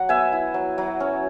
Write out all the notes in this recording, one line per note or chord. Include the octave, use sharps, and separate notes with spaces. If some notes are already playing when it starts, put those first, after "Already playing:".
Already playing: F#3 F#5
B3 E5 G#5
E4
F#3
F#3
C#4